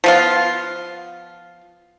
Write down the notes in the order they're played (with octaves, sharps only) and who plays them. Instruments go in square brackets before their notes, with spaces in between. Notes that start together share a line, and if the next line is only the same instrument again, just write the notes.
[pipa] F3 B3 F4